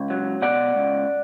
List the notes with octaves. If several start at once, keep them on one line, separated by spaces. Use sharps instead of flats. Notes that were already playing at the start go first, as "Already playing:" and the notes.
Already playing: C#2
F#3
B2 D5 F#5
C#2